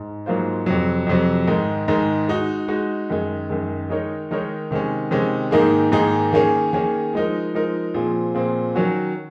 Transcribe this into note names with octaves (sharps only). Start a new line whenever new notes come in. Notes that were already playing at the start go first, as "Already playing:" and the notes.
Already playing: G#2
G#2 F#3 A#3 F4 C5
F2 C3 F#3
F2 C3 F#3
G#2 D#3 G#3
G#2 D#3 G#3
G#3 D#4 F#4
G#3 D#4 F#4
F#2 D#3 G#3
F#2 D#3 G#3
D#3 G#3 D#4 A#4 C#5
D#3 G#3 D#4 A#4 C#5
C3 D#3 G#3 C#4
C3 D#3 G#3 C#4
G#2 D#3 A#3 D#4 G#4
G#2 D#3 A#3 D#4 G#4
D#3 A#3 C#4 G#4
D#3 A#3 C#4 G#4
F3 G#3 D#4 A#4
F3 G#3 D#4 A#4
A#2 F3 C4 F4 G#4
A#2 F3 C4 F4 G#4
D#3 F#3 C#4 F#4